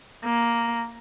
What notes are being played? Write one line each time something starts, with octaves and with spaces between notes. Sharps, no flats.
A#3